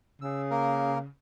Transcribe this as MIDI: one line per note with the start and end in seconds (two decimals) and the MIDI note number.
0.22 1.07 49
0.22 0.42 88
0.51 0.98 58
0.51 0.98 70